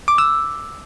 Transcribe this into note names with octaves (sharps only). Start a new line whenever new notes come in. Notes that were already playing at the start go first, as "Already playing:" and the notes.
D6
E6